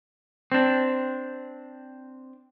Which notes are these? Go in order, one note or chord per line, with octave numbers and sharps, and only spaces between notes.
C4 D4